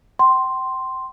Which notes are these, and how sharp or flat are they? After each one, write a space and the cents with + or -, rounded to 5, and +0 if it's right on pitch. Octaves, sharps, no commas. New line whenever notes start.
G5 -40 C6 +0